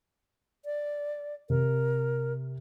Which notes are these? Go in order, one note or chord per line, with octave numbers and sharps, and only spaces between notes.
D5
C3 A#4